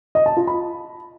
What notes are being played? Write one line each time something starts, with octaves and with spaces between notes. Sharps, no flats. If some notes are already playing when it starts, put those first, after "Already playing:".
D#5
A5
F4
B5